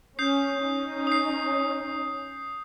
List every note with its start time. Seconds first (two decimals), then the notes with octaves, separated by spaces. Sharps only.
0.19 C#4 D#6 G6 C7
0.62 C#4 D#4
1.07 D#6 G6 C7